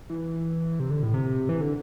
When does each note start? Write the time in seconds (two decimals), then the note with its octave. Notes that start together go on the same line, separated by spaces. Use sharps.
0.10 E3
0.80 C3
0.91 D3
1.03 A2
1.14 C3
1.49 E3
1.61 D3